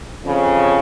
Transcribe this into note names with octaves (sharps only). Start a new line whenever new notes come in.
F2 C#3